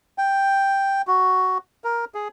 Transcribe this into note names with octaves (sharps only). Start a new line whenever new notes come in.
G5
F#4
A#4
G#4